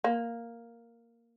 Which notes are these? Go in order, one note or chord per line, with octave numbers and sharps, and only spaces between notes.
A#3